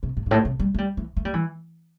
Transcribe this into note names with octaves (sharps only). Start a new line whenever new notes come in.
C3
A2
G2
A2
C3
G3
A3
G3
E3
A3
G3
E3